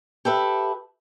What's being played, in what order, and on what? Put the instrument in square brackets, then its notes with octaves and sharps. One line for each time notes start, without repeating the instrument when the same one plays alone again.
[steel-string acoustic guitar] G4 A4 B4 E5